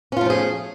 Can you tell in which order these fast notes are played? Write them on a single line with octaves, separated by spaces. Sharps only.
C#4 F4 A3 F3 G#4